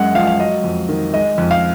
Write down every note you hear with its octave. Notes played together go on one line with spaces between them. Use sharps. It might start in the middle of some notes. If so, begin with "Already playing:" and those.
Already playing: F#2 G#3 F#5
F3 F5
F5
F#3 D#5
F2
D#3
G#3 D#5
F2
F5